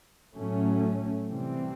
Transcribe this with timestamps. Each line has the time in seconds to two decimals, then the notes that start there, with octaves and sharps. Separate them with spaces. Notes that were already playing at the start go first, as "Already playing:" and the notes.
0.34 A2 F#3 A3 C#4
1.28 C3 E3 G3 C4